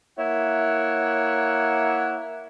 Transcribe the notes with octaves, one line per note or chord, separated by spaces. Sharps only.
A#3 E4 C#5 F#5